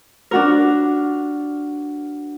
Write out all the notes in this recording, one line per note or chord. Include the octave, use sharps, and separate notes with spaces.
D4 F#4 A#4